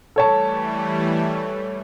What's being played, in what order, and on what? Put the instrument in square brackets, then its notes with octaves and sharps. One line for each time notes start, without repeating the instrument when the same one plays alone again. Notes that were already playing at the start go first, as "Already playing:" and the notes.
[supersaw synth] E3 G3 A3 [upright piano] A4 C#5 A5